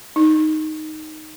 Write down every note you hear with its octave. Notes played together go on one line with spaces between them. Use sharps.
D#4